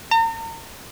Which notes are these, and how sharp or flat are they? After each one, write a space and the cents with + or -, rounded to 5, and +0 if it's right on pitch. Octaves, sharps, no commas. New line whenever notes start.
A#5 -40